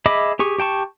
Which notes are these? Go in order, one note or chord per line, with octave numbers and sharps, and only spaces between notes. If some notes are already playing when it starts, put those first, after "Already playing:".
G#4 D#5 E5 B5 D6
G4 G#4 C#6
G4 G5 A5 C#6